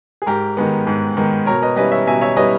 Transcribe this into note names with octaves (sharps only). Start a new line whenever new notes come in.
G#4
G#2 G4 A#4
D#3 G#3 B3
G#2
D#3 G#3 B3
B2 A#4 C#5
B4 D#5
G3 C#4 E4 B4 D#5
C#5 E5
B2 E5 G#5
C#5 E5
G3 C#4 E4 B4 D#5